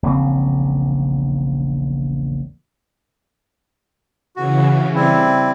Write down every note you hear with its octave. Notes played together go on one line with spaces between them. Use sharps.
E1 A#1 C#3 C4
C#3 E3 F#4
G3 C4 E4